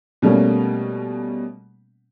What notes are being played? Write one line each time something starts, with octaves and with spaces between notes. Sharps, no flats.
B2 G3 A3 A#3 C#4